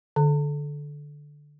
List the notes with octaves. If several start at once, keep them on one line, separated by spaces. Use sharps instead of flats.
D3